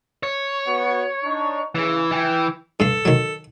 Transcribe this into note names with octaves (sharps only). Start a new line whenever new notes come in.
C#5
B3 F#4
D4 D#4
C#3 E3
E3 G5
G2 A4 F5
D#3 F#3